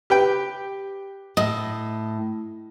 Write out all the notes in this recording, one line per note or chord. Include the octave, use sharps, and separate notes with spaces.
G4 B4 G5
A2 D#5